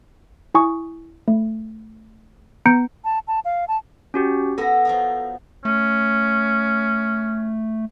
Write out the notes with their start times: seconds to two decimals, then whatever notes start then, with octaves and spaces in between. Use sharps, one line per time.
0.55 E4 G#5 C#6 D#6
1.28 A3
2.66 B3 A#5 G6 C#7 D7
3.04 A5
3.27 A5
3.45 F5
3.68 A5
4.14 C#4 F#4 G4
4.58 B3 E4 A4 A#6
4.85 F3 F#3 D#4
5.65 A3 C#4